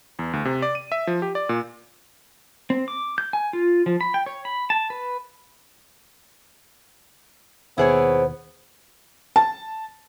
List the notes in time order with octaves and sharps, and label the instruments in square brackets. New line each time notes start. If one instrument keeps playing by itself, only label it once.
[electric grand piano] E2
D2
C3
D5
D#7
E5
F3
G4
D5
A#2
[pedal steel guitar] C4
D6
G6
G#5
F4
F3
B5
G5
C#5
B5
A5
B4
[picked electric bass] D#2 B2 [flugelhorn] B3 [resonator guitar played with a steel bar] E4 G#4 C#5 [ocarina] C5
[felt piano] A5